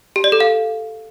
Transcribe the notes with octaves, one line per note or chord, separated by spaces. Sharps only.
G4
D5
A4
F5